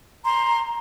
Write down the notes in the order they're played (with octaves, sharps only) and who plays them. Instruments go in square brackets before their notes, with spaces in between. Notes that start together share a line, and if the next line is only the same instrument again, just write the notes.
[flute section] A#5 C6